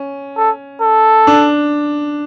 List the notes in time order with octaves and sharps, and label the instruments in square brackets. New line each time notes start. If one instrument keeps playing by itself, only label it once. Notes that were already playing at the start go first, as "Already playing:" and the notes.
Already playing: [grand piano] C#4
[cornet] A4
A4
[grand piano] D4